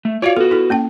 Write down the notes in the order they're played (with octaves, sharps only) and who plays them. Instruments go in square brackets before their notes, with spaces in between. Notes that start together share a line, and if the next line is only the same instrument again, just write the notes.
[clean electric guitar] A3
[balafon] F4 F#4 F5 [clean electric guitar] C#5 D5
[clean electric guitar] B3 F#4 [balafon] A4
[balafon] E4 A4
A#3 C#4 G5